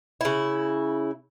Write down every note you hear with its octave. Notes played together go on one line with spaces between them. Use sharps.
C#3 E4